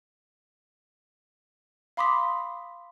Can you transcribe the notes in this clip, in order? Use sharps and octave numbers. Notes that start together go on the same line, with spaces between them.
F5 B5 C6 D6 D#6 B6